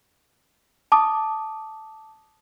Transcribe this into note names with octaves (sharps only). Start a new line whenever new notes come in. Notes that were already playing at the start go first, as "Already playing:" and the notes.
A5 D6 D#6